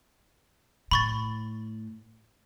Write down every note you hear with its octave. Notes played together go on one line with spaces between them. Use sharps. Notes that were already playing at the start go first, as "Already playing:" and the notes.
A2 B5 C#6 A6